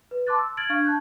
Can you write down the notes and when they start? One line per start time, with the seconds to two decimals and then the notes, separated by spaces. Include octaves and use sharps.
0.11 B4
0.27 A5 C6 D6 F#6 A6
0.38 E6
0.57 F6 G#6 A6 D7 F#7
0.69 D4 F5 C#6 F6 G#6
0.85 A5 F#6 G6